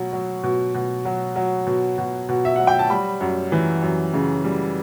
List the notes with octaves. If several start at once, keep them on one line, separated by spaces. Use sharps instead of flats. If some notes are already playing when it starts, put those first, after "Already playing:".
Already playing: B2 F#3
F#3
B2
B2
F#3
F#3
B2
B2
B2
E5
F#3 F#5
G5
A5
G3 B5
F#2
E3
F#2
C#3
G3